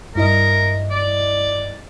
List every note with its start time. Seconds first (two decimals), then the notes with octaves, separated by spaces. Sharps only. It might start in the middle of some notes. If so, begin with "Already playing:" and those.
0.15 G2 E4 A#4 D#5
0.91 D5